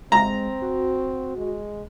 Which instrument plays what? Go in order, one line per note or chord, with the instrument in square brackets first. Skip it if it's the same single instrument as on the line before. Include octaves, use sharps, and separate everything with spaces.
[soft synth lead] G#3 [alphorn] C4 [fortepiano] A#5
[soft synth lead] F#4
[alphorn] G#3